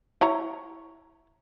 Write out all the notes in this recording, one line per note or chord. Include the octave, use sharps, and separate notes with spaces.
E4 C#5 A#5